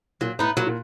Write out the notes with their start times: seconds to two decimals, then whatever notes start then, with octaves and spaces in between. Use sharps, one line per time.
0.21 A#2 F#3
0.39 A2 B3 D#4
0.57 A#2 F#3
0.67 A#2